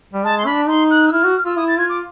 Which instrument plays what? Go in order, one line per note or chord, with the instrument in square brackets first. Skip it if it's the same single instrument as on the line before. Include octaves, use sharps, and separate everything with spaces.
[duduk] G3
[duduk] G#3 [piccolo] A5
[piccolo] C6
[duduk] D4 [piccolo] B5
[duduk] D#4 [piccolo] C6
[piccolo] F#6
E6
[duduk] E4 [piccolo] F6
[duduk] F#4
[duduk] F4 [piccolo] E6
[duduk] E4 [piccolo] D#6
[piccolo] A6
[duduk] F4 [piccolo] G#6
[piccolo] D6